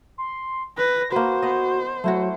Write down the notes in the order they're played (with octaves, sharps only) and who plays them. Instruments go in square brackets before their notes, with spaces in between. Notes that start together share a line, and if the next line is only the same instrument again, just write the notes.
[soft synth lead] C6
[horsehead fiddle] B4 [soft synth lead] A#6
[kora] A#3 B4 [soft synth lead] F#4 [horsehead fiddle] C5
[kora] B3 D#5
[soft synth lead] F#3 [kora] A3 E4 F#4